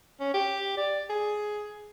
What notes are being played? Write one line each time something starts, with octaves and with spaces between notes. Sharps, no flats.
C#4
G4
D5
G#4